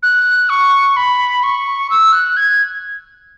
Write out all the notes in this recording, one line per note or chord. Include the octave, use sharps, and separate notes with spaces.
F#6
C#6
B5
C#6
E6
F#6
G#6